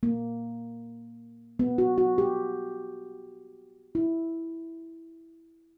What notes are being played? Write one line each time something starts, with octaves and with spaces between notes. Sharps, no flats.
A#3
B3
F#4
F#4
G4
E4